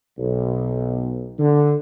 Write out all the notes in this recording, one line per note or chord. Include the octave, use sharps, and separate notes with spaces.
B1
D3